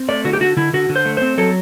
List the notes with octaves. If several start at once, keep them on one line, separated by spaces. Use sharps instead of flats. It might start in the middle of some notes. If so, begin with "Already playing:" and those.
Already playing: C4
A3 D5
D3 F#4
G4
D3 F#4
D3 E4
D3 F#4
D3
C5
A3
C4 C5
F#3 A4